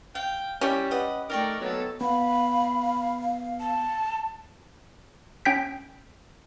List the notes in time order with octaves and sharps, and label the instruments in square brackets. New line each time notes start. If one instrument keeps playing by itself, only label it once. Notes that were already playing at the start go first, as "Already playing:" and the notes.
[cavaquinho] F5 [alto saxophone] G5
[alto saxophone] G3 [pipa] C#4 G4 [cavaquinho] E4
[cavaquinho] B4 D#5 F#5
[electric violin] A3 D5 [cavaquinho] D#4 G5 C#6 [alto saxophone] A#4
[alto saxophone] F#3 [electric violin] B3 A4
[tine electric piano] B3 [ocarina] F5 [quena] B5
[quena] A5
[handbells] C#4 G5 G6 B6